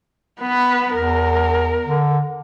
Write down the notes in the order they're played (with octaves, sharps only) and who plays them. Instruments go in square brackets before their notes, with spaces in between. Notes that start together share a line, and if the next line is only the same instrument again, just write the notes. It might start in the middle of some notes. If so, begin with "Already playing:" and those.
[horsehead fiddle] B3 B4
[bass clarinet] E2 [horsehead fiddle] A#4
[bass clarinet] D3